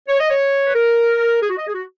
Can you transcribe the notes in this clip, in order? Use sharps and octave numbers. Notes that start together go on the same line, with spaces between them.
C#5
D#5
C#5
B4
A#4
G#4
F#4
D#5
G#4
F#4